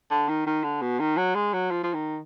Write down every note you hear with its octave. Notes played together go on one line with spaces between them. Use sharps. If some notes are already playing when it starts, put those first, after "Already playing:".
D3
D#3
D#3
D3
B2
D#3
F#3
G#3
F#3
F3
F3
D#3